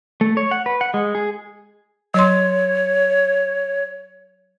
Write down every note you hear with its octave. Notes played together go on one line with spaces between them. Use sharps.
A3
C#5
F#5
B4
F#5
G#3
G#4
F#3 C#5 C6